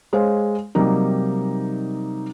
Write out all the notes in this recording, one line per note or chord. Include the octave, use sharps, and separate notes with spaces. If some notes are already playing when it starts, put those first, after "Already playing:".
G#3 G#4 C5 C#5 F5
C3 F#3 G3 A#3 D#4